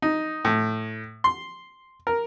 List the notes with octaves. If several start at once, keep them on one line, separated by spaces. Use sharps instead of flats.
D#4
A2
C6
A#4